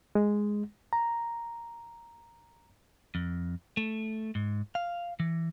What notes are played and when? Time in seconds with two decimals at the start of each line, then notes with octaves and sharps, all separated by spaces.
0.15 G#3
0.93 A#5
3.15 F2
3.77 A3
4.35 G#2
4.75 F5
5.20 E3